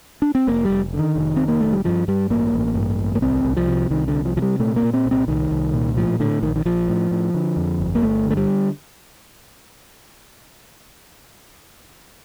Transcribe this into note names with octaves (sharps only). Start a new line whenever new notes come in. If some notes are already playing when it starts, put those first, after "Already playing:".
D4
C4
F1 A#3
G3
F1
D3
D#3
F1
F1 C4
A#3
F1 A3
G3
G2 F3
G2 G3
A1 A#3
A1
G2
A1
A#3
C2 C4
C2
F3
C3
C2 D#3
D3
C3
F3
C3 F3
G3
A#2 A3
A#3
A#2
C4
C2
C4
C2 D#3
C2
A#2
A2 F3
A2 D3
A#1 D#3
D#3
A#1 F3
A2
A2
D3
F2
G1
A#3
G1 A3
D3
A3
G3